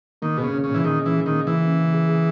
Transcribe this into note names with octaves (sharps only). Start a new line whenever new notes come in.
D#3 A#3
B2 G#4
C#3
C#4
C#3
A#2
E3
D#3 G#4
C#4
E3
G#4
D#3
A#3
C#3 E3
C#4
C#3
G#4
G#4